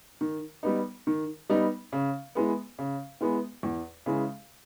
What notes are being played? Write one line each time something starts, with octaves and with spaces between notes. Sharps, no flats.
D#3
G3 B3 D#4
D#3
G3 B3 D#4
C#3
E3 G#3 B3
C#3
E3 G#3 B3
E2
C#3 E3 G#3